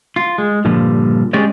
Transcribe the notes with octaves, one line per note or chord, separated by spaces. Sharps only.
F4
G#3
G2 A#2 D3 F3 G3
G#3 C#4 G4 D5 D#5